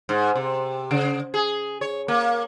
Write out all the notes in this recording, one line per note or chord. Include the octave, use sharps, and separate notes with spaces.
G#2
C3
C#3
G#4
C#5
A#3